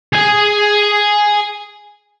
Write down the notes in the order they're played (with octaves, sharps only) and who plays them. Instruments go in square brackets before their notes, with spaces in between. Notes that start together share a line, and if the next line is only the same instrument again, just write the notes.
[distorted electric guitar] G#4 G#5